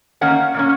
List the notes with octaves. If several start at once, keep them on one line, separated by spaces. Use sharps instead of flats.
D#3 A#3 C#4 F#5
A#2 A#3 C#4